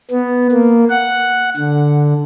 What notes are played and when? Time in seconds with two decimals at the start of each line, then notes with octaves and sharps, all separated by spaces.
0.11 B3
0.52 A#3
0.90 F#5
1.57 D3